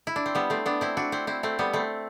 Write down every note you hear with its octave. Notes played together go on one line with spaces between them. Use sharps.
E4
D4
C4
G3 B3
A3 C4
B3 D4
C4 E4
D4 F#4
C4 E4
C4 E4
A3 C4
G3 B3
A3 C4